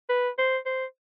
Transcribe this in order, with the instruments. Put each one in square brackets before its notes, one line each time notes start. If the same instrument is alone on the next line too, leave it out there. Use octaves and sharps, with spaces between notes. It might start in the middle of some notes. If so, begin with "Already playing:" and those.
[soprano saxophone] B4
C5
C5